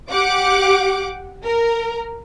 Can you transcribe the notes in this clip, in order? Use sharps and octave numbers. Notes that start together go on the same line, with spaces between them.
G4 F#5 D6
A#4